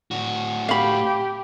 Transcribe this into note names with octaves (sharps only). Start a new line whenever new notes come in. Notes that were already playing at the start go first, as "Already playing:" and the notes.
A2 F#4
G4 F5 B5